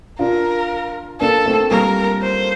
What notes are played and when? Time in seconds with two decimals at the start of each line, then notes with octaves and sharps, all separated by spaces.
0.19 D4 F4 A#4
1.20 A#3 D4 A4
1.46 A3 C4
1.71 G3 A#3 A#4
2.22 C5